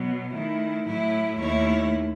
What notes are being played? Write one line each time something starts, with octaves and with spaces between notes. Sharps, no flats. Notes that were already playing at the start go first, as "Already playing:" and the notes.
Already playing: B2 F#3 B3
D#3 A3 E4
A2 F#3 A3 E4
D#2 D#3 A3 E4 C#5